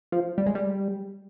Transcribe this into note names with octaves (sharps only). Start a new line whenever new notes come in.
F3
G3
G#3
G3